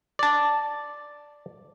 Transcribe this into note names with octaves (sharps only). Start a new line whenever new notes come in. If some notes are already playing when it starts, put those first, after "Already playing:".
D5 A5